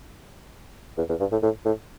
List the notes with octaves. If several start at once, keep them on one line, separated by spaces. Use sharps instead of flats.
E2
E2
G2
A2
A2
A2